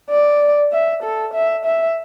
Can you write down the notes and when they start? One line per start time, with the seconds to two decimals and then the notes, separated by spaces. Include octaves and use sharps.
0.10 D5
0.72 E5
1.03 A4
1.34 E5
1.65 E5